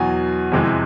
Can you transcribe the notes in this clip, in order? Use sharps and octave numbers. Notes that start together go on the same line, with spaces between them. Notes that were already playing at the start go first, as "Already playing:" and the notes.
Already playing: E2 B2 F#3 G#5
F2 C3 E3 G#3